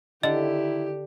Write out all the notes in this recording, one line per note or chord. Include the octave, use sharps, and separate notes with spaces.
D3 D#3 E4 G4 D#5